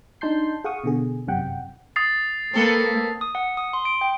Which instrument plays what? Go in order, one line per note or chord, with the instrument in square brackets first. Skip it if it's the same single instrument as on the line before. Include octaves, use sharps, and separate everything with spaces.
[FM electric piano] D4 D#4 A5 C6 G6 C7
G#4 F5 F#5 C#6 D#6
B2 D3 G#4
G1 F#2 C3 F#5 G5
[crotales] D#6 A6 C7
[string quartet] A#3 [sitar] C4 A4 B4
[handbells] D#6
F#5
D#6
C6
D7
G5